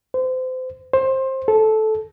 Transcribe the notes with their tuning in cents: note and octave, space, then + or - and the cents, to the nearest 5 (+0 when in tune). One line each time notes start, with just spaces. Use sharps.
C5 -30
C5 +20
A4 -15